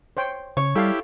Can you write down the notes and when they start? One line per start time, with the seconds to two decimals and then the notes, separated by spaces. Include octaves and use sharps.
0.17 C5 C#5 G5
0.57 C#3 C#5
0.76 G3 E4 G4 A4 F5